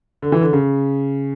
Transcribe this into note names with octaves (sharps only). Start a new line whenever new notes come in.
D3
E3
D3
C#3